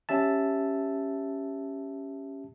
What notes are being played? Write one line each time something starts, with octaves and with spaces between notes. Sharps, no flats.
C#4 G4 E5 A5